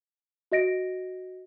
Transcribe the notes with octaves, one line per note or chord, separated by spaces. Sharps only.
F#4 D#5 A#6 D7